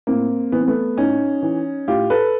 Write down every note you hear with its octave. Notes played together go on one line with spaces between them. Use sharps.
A2 A#3 C4
E3 B3
C4
A3 B3
A2 C#4 D#4
E3
A2 F4 G4
A4 B4